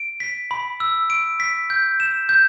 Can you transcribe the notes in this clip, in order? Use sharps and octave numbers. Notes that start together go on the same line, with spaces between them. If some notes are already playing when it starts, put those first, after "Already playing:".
Already playing: D7
B6
B5
E6
D7
B6
G6
E7
G6